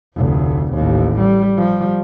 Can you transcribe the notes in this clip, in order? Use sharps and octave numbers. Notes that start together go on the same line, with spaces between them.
F1 D2
A1 D#2
G3
F3 G3